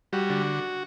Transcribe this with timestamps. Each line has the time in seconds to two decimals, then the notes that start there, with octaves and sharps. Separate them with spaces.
0.13 G3 F#4
0.30 D3